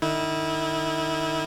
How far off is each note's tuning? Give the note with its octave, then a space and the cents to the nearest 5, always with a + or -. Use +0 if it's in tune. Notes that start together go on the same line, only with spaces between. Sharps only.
D#3 -40 E4 -30